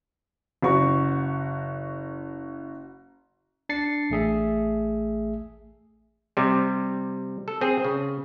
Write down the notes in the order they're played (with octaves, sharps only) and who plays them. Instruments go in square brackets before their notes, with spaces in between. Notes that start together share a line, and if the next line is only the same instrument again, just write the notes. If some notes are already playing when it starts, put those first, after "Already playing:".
[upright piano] F#1 F#4 C#6
[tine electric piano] D4 A6 C7 C#7
A1 A3 G#4 E5
[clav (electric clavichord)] C3 G3
A4
C4 G#4
C#3